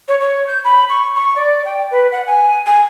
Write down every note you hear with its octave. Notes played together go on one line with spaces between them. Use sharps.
C#5
C#5
G6
B5
C#6
C#6
D5
G5
B4
F#5
G#5
G#5